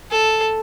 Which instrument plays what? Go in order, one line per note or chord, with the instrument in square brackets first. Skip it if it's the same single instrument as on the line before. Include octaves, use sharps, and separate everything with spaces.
[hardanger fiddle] A4